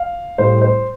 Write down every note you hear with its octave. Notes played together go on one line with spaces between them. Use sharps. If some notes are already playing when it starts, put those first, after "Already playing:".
Already playing: F5
A2 G3 C5
C5